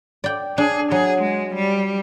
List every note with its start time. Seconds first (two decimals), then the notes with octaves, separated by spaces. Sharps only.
0.24 D5 G5
0.58 D4 G#4
0.92 F#3 G#4
1.22 G#3
1.55 G3